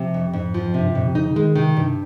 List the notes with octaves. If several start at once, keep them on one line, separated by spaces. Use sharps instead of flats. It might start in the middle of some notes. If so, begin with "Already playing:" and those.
Already playing: C3 F3
F2
F2 G#2
F3
G2 C3
G#2
F2 A#2
C3
C#3 D#4
C#3
D#3 G#3
C3 D#3
G2 C3